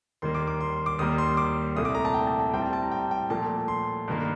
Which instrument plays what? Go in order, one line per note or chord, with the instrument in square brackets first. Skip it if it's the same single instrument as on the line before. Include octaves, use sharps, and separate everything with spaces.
[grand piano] D#2 D#3 G3 A#3 C6
D6
D6
C6
D6
D#2 D#3 G3 A#3 D#6
C6
D6
C2 A#2 A3 D#6
D6
A#5
A5
G5
A5
A5
A2 G3 C4 G5
A5
A5
A#5
G5
G5
A#2 F3 A3 A5
C6
G2 D#3 A#3